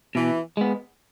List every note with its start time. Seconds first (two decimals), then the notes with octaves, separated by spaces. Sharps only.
0.15 B2 E3
0.57 G#3 B3